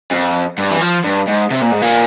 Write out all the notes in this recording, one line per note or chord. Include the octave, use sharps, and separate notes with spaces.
F2
G2
E3
F3
G2
G#2
C3
A#2
G#2
A#2